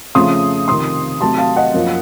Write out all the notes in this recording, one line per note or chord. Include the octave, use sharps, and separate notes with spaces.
F2 C#3 F3 A3 C6 D#6
F2 C3 D#3 C6 D#6
C3 F#3 A3 A5 C6
F5 A5
D#5 F#5
F#2 F3 A#3